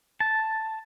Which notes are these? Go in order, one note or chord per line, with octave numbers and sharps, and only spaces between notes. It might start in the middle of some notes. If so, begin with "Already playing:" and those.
A5